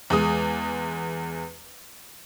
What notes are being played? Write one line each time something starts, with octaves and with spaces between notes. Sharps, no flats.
E2 G#3 D#6